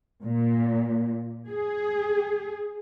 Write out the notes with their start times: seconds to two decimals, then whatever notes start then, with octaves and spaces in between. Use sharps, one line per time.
0.24 A#2
1.49 G#4